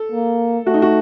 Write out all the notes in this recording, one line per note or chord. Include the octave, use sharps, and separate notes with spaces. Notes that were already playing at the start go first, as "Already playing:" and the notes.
Already playing: A4
A#3
A3 F#4
D#4
F#4